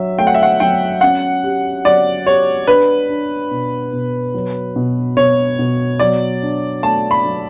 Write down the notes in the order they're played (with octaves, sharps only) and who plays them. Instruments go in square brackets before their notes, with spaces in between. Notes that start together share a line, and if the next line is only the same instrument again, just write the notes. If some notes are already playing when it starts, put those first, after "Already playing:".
Already playing: [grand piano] F#3 [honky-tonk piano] E5
[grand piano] A3 [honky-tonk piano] G5
[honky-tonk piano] F#5
E5
F#5
[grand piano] F#3 [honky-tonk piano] G5
[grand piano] C#4 [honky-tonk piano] F#5
[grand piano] G4
[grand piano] F#3 [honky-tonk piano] D5
[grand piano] G4 [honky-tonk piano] C#5
[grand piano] D4 [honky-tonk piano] B4
[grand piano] D4
B2
B2
F#3
B2
[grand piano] B2 [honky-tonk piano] C#5
[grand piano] B2
[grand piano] F#3 [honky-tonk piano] D5
[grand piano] D4
[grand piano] A3 [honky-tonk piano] A5
[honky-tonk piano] B5
[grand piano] F#3